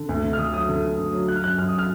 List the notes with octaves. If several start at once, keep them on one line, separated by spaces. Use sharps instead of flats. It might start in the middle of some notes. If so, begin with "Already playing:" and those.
Already playing: D3
D2
D3
F6
D3 D#6
F#3 D#6
D3
D2
D2
F#3
F#3 F#6
F6
F#2 F#6
F#2 F6
D#6
F6